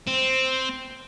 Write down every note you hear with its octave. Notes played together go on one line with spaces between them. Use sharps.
C4